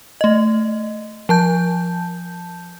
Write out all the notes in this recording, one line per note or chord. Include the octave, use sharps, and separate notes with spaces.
A3 D#5
F3 A5 G6